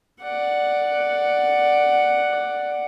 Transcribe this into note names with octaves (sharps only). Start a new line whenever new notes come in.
D5 F#5